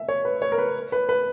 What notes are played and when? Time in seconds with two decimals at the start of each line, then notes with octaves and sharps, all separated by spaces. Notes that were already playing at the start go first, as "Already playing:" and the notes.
Already playing: E5
0.08 C#5
0.25 B4
0.42 C#5
0.52 A#4
0.58 B4
0.92 B4
1.09 B4